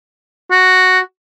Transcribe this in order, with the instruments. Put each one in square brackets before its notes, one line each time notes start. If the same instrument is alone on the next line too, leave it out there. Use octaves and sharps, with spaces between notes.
[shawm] F#4